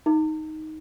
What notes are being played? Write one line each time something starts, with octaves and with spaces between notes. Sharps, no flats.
D#4